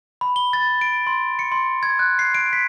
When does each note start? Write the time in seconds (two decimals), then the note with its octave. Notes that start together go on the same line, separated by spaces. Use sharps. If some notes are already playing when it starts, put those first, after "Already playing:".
0.21 B5
0.36 G7
0.53 A6
0.81 D7
1.07 C6
1.39 C#7
1.52 C6
1.83 G#6
1.99 F#6
2.19 C7
2.35 D7
2.53 B6